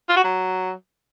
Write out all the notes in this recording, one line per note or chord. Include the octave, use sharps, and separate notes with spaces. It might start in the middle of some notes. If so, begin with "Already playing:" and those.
F4
F#4
F#3